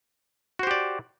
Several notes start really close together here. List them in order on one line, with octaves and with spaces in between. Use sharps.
F#4 C5 G4 D5